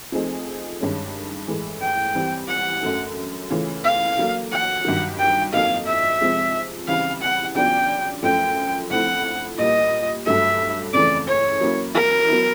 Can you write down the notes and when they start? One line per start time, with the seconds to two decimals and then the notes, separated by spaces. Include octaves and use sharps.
0.12 F3 A3 C4 D#4 G#4
0.80 G2 D#3 G#3 C#4
1.47 A2 E3 G#3
1.81 G5
2.15 E3 G3 C4
2.49 F#5
2.82 F#2 D3 F#3 A3
3.50 C#3 E3 A3 C#4 F4
3.84 F5
4.17 D3 F#3 A#3
4.51 F#5
4.85 G2 D#3 F#3
5.19 G5
5.53 F2 D3 F#3 A#3 D#4 F5
5.87 E5
6.21 C3 F3 G#3
6.87 C#3 E3 G3 C4 E4 F5
7.21 F#5
7.55 C#3 F#3 B3 D4 F4 G5
8.23 F#2 D3 F3 A3 G5
8.90 D3 F3 A3 C4 E4 F#5
9.58 A#2 G3 A#3 D#5
10.25 G2 D3 F#3 A3 E5
10.93 F2 C#3 E3 A3 D5
11.27 C#5
11.61 F#3 A#3 C#4 E4
11.94 A#4
12.28 F#3 B3 E4